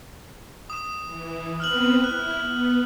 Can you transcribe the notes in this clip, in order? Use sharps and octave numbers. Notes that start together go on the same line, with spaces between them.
D#6 E7
E3
B3 C4 B4 F6 F#6 F#7
E4 F#6
B3